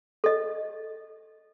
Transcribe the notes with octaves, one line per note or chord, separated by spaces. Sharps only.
A4 D#5